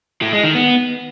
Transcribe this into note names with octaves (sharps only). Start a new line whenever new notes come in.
A2
G#3
D#3
B3